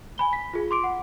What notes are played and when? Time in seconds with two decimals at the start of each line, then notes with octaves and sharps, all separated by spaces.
0.18 G#5 B5 G7
0.33 B6
0.53 F4 G#4
0.71 C6 D6 D7
0.84 F#5